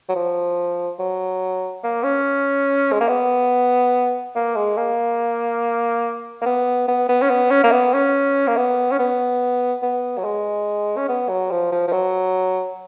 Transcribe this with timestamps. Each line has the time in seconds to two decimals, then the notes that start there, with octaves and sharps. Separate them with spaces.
0.09 F#3
0.15 F3
0.99 F#3
1.83 A#3
2.03 C#4
2.92 G#3
3.01 A#3
3.09 B3
4.35 A#3
4.56 G#3
4.77 A#3
6.42 A#3
6.46 B3
6.88 B3
7.09 B3
7.22 C#4
7.29 B3
7.51 C#4
7.64 A#3
7.71 B3
7.94 C#4
8.47 A#3
8.57 B3
8.91 C#4
8.99 B3
9.82 B3
10.18 F#3
10.24 G#3
10.97 C#4
11.09 B3
11.29 F#3
11.51 F3
11.72 F3
11.88 F3
11.92 F#3